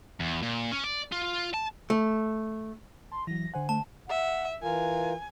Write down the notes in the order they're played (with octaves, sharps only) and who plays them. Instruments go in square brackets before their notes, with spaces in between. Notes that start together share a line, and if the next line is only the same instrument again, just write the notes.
[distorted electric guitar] E2
A#2
C#4
D5
F4
A5
[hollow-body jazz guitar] A3
[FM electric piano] A5 [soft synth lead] C6
[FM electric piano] E3 F#3 [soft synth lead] A#6
[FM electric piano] D3 C5 F#5 [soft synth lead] G#5
[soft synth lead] A3 [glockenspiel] A5
[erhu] E5 [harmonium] F#5
[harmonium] E3 F4 A#4 [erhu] G#5